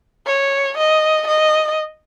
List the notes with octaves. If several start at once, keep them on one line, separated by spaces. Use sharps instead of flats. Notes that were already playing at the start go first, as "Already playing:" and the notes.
C#5
D#5
D#5